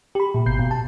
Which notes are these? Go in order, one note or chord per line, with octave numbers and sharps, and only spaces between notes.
G4 B5
A#2
G#1 B2 G6 C7
B2
A5